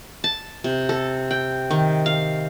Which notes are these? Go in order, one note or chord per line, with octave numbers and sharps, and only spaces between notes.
A5
C3
A4
G5
D#3
F5